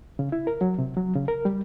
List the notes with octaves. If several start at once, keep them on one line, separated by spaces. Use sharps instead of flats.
C#3
E4
A#4
F#3
C3
F#3
C#3
A#4
G3